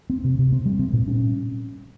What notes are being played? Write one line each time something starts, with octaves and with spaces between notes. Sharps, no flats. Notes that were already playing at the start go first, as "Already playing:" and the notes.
C4
C3
C3
C4
G3
C4
A#2
C#4